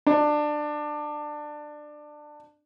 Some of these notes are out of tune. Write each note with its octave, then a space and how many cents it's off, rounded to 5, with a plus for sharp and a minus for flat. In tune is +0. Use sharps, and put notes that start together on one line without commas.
D4 +20